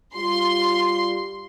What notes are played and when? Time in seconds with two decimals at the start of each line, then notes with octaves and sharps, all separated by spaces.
0.16 G3 F4 C6